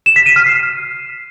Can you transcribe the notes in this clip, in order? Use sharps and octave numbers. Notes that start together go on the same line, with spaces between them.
E7
B6
D#7
F6
C7